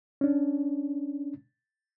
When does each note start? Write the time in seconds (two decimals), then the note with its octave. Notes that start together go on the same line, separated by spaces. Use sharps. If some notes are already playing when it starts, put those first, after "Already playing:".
0.21 C#4 D4